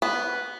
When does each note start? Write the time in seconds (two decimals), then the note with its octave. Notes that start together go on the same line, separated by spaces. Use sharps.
0.02 B3